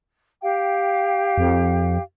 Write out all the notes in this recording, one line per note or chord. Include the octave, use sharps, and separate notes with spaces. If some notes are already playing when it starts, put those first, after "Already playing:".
G4 F5 G5
F2